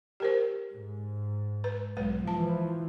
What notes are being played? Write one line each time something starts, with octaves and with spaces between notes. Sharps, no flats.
G4 A#4 C5
G#2
B4
B1 G#3 B4
E3 F3 A5